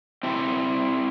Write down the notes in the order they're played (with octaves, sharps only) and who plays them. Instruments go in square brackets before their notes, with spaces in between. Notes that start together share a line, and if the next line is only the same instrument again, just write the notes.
[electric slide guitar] C4 E4 G4